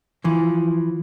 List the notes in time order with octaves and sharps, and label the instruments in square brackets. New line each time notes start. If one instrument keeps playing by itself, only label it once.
[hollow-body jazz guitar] E3 F3